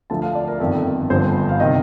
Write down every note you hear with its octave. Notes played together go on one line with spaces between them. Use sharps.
D2 D3 F3 A5
F5
D5
A#4
G1 F2 D#3 A4
G1 G2 D3 F3 C5
F5
C3 D#3 D#5